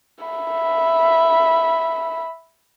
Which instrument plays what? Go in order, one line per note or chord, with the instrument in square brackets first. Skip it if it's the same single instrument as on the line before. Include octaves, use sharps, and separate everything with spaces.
[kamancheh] E5 B5